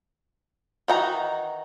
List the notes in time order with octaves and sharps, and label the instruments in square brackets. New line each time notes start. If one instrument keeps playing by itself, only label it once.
[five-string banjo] D#3 E3 D#4 F#4 A#5